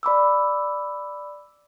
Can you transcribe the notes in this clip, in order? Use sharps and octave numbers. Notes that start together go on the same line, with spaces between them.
D5 B5 D6 E6